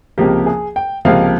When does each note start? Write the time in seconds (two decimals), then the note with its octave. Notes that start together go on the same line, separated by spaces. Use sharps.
0.18 C#2 C3 F3 A#3 G4
0.46 G#4
0.76 G5
1.05 C#2 C3 F3 A#3 F5